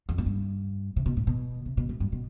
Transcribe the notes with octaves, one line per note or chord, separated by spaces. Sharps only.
F2
A2
G2
C3
B2
A2
B2
C3
B2
A2
G2
B2